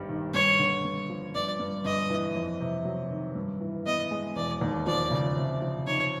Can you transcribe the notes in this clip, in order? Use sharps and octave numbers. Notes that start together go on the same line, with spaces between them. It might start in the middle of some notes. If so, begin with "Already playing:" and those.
Already playing: G#1 G2 G3
D#3
G2 C#5
D3
G2
F3
G1 D5
G2
G1 D#5
E3
F2
C3
F#3
D#3
G2
E3
B3 D#5
G#3
E1 D5
D#2
F3 D5
C#3
C3
F3
D#4 C#5